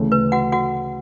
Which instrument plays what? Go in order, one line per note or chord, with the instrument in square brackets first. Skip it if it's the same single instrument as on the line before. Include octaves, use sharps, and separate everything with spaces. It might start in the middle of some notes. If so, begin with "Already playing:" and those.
Already playing: [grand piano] D2 C#3 E3 A3
[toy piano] B4
F#4 F#5
F#4 F#5